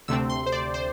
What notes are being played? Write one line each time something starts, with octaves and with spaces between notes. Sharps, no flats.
D2 C3 A3 C4 E6
C6
C5
D5
C5